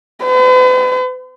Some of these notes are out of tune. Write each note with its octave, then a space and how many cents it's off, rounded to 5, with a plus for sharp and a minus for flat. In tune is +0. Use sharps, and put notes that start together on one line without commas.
B4 +45